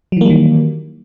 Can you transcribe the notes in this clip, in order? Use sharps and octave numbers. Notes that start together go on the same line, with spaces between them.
D#3 E3 F#3 G3 A#3